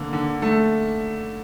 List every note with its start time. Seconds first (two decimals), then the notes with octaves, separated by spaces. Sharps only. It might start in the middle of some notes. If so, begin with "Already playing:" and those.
Already playing: D3 A#3
0.13 D3
0.42 A3